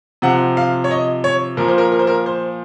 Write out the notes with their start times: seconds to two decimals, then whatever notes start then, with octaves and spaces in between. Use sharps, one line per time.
0.22 C3 F3 F#5
0.57 F5
0.84 C#5
0.91 D#5
1.24 C#5
1.57 A#2 F3 A#4
1.68 C5
1.78 A#4
1.92 A#4
1.99 C5
2.07 A#4
2.26 C5